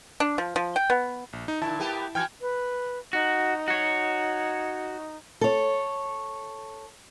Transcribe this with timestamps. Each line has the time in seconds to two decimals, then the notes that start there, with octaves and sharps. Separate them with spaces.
0.20 D4
0.38 F3
0.56 F3
0.76 G5
0.90 B3
1.33 A#1
1.48 D#4
1.62 A#2 D3 E4 A5
1.79 A#3 B3 G4
2.15 E3 F#4 G5 F6 G#6
2.41 B4
3.13 D#4 F#4
3.68 F#4 C#5
5.41 A4 C#5